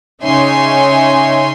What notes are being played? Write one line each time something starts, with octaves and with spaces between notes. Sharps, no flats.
C#3 D#4 C#5 E5 G#5 C6